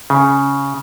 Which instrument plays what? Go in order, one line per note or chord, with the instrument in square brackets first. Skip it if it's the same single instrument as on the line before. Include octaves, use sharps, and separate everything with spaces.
[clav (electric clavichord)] C#3